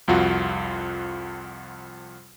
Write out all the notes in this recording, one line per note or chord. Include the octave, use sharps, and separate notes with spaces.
C2 F2 F4 F#4